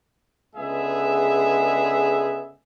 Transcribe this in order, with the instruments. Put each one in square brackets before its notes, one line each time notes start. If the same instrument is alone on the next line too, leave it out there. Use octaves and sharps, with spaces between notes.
[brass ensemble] C#2 D3 G#3 B3 G#4 E5